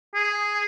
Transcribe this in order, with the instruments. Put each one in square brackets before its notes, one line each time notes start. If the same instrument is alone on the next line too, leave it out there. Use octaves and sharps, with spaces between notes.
[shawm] G#4